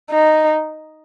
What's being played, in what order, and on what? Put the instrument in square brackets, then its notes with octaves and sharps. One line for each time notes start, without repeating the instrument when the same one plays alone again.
[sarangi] D#4